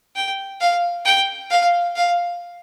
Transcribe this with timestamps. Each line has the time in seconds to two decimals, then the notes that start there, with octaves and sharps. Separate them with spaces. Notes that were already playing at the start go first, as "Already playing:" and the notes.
0.16 G5
0.60 F5
1.05 G5
1.50 F5
1.96 F5